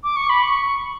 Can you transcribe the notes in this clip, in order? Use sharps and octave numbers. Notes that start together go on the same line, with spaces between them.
D6
C#6
B5
C#6